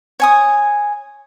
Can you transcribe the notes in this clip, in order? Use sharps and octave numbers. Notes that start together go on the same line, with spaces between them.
C#5 G#5 D#6